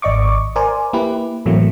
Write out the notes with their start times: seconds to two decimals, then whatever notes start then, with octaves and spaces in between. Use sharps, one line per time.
0.02 G#1 D5 D#5 C#6 D6
0.56 A#4 C5 D5 G#5
0.93 A#3 E4 G4 B4
1.46 A2 E3 F#3 A3 A#3 C4